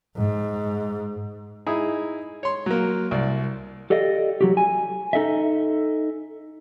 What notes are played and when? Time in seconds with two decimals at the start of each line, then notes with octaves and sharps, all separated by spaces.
0.16 G#2
1.67 D#4 E4 G#4
2.43 C#5 C6
2.66 F#3 A#3
3.11 C2 D5
3.90 G4 A4 D5 D#5 F5
4.41 F#3 F#4 G4
4.57 G#5
5.13 D#4 A4 D#5 E5